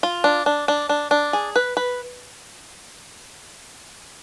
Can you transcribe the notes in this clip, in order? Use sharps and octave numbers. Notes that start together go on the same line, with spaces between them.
F4
D4
D4
D4
D4
D4
G#4
B4
B4